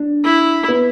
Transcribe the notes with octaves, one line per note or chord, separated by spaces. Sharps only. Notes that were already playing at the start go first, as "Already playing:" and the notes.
Already playing: D4
E4
B3